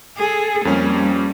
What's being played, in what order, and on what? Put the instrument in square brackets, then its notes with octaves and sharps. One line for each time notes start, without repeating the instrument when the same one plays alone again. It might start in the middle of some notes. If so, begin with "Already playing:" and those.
[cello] G#4 A4
[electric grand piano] F2 A#3 C#4 [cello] G3